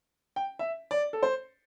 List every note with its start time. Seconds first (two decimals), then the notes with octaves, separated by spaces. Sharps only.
0.36 G5
0.59 E5
0.91 D5
1.13 A4
1.23 C5